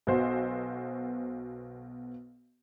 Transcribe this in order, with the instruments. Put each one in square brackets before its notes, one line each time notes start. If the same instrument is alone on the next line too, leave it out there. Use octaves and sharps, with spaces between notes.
[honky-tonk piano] B1 B2 F#4 C5